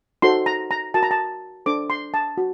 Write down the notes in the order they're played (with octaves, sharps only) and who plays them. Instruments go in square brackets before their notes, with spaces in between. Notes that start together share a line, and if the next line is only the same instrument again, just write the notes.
[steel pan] D#4 F#4 A4 C5 C6
A#5
A#5
F#4 A#4 A5
A#5
A5
D4 A4 C5 D6
C6
A5
F#4